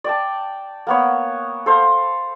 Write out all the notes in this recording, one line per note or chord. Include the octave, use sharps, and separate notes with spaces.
D5 G5 A5
A#3 B3 C#5
A4 C5 F5